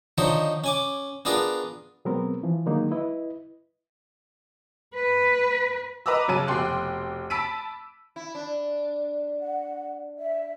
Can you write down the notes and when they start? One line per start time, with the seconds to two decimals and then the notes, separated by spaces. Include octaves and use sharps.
0.18 D3 D#3 F3 D#4 C5 C#5
0.64 C#4 G#5 D6
1.25 B3 D4 F4 G#4 A#4
2.05 B2 F#3 G#3 B3 C4 A#4
2.43 E3 F3
2.66 D3 D#3 F#3 G#3 A#3 D#4
2.91 E4 B4 D#5
4.95 B4
6.06 B4 D#5 A#5 D6 E6
6.28 F#2 C#3 F#3 A5 D#7
6.47 F1 B2 G5 C6 F#6
7.30 A5 B5 E6 B6 D7 D#7
8.16 E4
8.35 D4
9.41 F#5
10.18 E5